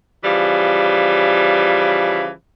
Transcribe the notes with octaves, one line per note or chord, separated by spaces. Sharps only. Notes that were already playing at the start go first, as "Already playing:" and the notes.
C#3 E3 F3 G3